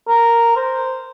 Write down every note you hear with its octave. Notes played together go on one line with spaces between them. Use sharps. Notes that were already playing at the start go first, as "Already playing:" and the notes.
A#4
C5